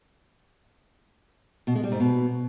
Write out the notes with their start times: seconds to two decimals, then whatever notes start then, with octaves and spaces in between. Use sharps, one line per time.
1.67 B2
1.75 G#3
1.84 G3
1.92 G#2
2.00 B2